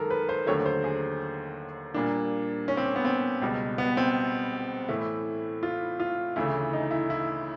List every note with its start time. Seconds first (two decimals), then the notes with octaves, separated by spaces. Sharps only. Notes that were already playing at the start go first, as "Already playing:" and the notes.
Already playing: F#2 D#3 G#3 A4 A#4
0.10 B4
0.29 C5
0.47 D#2 D3 F#3 A3 C#5
0.66 C5
0.84 G#4
1.94 A#2 G3 A#3 D4
2.68 C#4
2.77 C4
2.96 B3
3.05 C4
3.42 C#2 B2 G3
3.78 B3
3.97 C4
4.88 A2 E3 A3 E4
5.63 F4
6.00 F4
6.36 D2 C#3 E3 A3 E4
6.73 D#4
6.91 E4
7.10 E4